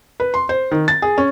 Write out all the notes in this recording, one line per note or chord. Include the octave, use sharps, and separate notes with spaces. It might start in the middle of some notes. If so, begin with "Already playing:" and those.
B4
C6
C5
D#3
A6
G#4
C#4